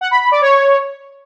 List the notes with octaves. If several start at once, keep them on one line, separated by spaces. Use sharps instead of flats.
F#5
B5
B5
D5
C#5